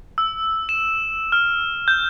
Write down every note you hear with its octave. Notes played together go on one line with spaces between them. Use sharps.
E6
E7
F6
G6